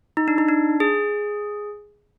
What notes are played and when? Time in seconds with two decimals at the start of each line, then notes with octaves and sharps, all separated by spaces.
0.17 D#4
0.28 D4
0.38 D#4
0.49 D4
0.80 G#4